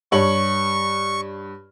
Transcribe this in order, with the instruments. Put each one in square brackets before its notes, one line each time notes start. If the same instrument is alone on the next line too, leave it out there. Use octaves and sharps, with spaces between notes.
[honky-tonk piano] G2 C#5 F#7 [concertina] C#6